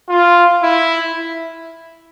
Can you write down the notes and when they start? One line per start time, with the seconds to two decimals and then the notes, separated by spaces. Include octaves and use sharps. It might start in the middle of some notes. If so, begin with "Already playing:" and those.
0.09 F4
0.63 E4